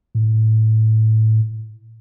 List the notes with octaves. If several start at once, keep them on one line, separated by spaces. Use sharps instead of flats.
A2